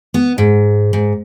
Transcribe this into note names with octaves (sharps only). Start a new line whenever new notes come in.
B3
G#2
G#2